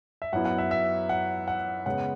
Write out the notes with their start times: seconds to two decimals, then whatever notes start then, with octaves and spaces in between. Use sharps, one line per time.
0.22 E5
0.33 F#2 F#3 B3 E4 F#5
0.45 F#5
0.58 E5
0.71 E5
1.09 F#5
1.48 F#5
1.86 C#3 G#3 B3 F#5